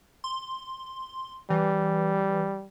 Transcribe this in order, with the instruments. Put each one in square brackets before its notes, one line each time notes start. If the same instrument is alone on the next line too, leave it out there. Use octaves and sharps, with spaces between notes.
[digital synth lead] C6
[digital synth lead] E3 [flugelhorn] G3